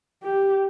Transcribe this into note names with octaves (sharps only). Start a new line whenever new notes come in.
G4